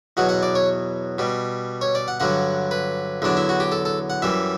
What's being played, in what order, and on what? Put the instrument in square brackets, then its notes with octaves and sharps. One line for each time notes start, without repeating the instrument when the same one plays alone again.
[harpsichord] E2 B2 F#3 F#5
F#5
D5
C#5
B2 G3
C#5
D5
F#5
G2 D3 F#3 F#5
B4
E2 D3 F#3 D4
E4
F#4
G4
A4
A4
F#5
F#2 E3 G3 E5